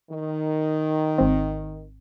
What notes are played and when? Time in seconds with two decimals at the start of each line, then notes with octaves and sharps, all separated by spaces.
0.11 D#3
1.18 G#1 C4